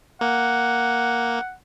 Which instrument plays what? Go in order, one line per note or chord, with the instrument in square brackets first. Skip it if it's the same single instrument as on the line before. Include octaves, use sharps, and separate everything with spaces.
[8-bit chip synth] A#3 [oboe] F#5